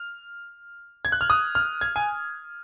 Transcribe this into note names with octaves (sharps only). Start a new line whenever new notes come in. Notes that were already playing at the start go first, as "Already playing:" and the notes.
Already playing: F6
G#6
F#6
F6
D#6
F6
G#6
G#5